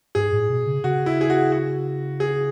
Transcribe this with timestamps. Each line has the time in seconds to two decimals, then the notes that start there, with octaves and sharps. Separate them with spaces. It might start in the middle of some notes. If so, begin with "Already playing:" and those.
0.15 G#2 G#4
0.33 A2
0.50 B2
0.66 C#3
0.84 C#3 F#4
1.06 E4
1.21 G#4
1.30 F#4
1.52 F#4
2.20 G#4